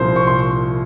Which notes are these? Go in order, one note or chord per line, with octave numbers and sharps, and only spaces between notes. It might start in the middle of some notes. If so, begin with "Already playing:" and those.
Already playing: C2 A#2 F3 C5
C#6
C6